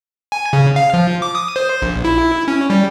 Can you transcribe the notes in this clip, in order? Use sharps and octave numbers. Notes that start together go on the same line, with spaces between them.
G#5
C#3
F5
F3
D6
D#6
C5
A#1
E4
C#4
G3